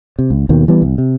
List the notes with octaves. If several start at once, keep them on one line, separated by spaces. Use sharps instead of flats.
C3
C#2
D#2 B2 D#3
E3 G3 B3
C2
C3